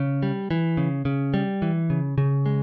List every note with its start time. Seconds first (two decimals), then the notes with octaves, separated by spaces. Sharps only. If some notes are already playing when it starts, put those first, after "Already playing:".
Already playing: C#3
0.23 G3
0.51 E3
0.77 C#3
1.05 C#3
1.34 G3
1.62 E3
1.90 C#3
2.18 C#3
2.46 G#3